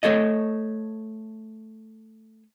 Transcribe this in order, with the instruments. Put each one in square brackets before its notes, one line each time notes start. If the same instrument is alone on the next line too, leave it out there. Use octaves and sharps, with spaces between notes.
[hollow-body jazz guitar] A3 A4 C#5 D#5